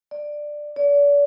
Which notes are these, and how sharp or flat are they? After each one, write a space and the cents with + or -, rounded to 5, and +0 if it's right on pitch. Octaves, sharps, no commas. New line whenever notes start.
D5 +10
D5 -40